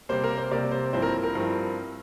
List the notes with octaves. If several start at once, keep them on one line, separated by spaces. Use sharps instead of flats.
C3 G3 A#3 C5
A#4
C5
C3 G3 A#3 D5
C5
G2 F3 C4 E4 C5
A#4
A#4
G2 F3 C4 E4